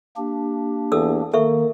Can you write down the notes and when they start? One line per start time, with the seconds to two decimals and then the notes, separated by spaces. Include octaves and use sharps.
0.17 A#3 D4 G4
0.92 E2 A4 D#6 E6
1.33 D#3 A#3 A4 E5 C#6